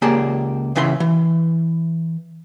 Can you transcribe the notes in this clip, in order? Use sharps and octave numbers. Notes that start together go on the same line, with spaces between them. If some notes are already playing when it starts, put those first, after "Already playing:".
C#2 A#3 G4 G#4 D5 A5
C#2 C#3 E3 E5 C6
E3